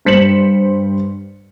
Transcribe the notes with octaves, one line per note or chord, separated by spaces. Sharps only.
G2 C5 B6 C#7 E7 F#7